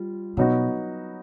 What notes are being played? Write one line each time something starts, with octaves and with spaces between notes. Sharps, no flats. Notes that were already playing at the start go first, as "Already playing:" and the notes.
Already playing: G3 F4
B2 F#3 B3 D#4 F#4